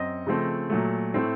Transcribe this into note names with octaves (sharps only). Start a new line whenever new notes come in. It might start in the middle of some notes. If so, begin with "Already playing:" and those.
Already playing: F#2 C4 D#5
C#3 F3 A3 C4
A#2 F#3 A3
A2 A3 C4